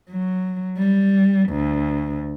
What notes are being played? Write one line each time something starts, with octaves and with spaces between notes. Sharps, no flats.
F#3
G3
D2